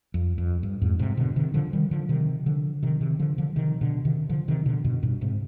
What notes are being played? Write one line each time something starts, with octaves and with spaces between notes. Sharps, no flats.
F2
F2
G2
F2 G#2
G#2 C3
B2 D3
C3 D#3
D3 F3
D#3 G3
D3 F3
C3 D#3
D3 F3
C3 D#3
C3 D#3
D3 F3
D3 F3
C3 D#3
B2 D3
C3 D#3
D3 F3
C3 D#3
B2 D3
G2 B2
G2 B2
G#2 C3